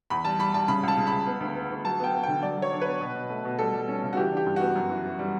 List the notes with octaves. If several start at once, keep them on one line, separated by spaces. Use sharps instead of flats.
E2 B5
G3 A5
G3 B5
G3 A5
C#3 B5
C#2 A5
C#3
C#2 B5
B3
D2
B3
D2
F#3 A5
B3 G5
B3
D3 G5
F#3 D5
F#3
C#5
D4
B3 B4
B2
B2
A3
B2
G3 A4
G3
C#4
C#3
F#4
E3 G4
D4 G4
G2
B3 F#4
F#2
E3
E3
G3